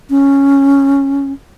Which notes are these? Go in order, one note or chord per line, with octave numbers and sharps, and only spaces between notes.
C#4